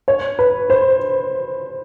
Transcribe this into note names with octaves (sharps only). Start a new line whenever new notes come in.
C#5
B4
C5